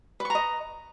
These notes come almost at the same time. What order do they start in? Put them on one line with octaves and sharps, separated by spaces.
B4 C#6 A#5 D#5